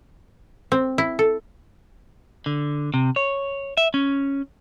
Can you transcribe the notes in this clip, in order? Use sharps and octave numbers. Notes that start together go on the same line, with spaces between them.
C4
E4
A4
D3
C3
C#5
E5
C#4